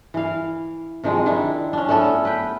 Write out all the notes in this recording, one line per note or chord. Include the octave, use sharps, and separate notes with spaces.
E3 F5
C3 D#3 F3 G#3
D#3 D4 E4
C#4 D4
A3 B3 C#4 A4
B4 G5